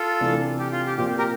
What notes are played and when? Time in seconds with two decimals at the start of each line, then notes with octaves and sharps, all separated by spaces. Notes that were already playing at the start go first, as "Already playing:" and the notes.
Already playing: F4 A4
0.21 C3 E3 A3 D4
0.59 G4
0.72 F4
0.86 G4
0.98 A#2 F3 C4 G4
1.18 G4 A#4